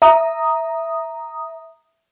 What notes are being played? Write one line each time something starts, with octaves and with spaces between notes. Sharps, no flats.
E5 A#5 D#6